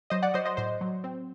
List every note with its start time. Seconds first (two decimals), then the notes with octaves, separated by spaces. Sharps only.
0.10 F#3 C5 D#5
0.22 D5 F#5
0.34 F#3 C5 D#5
0.45 C5 D#5
0.57 A2 C5
0.81 F#3
1.04 C4